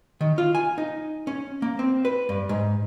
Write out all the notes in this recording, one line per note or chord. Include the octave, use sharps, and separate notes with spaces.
D#3
F4
G#5
D#4
C#4
A#3
C4
B4
G2
G#2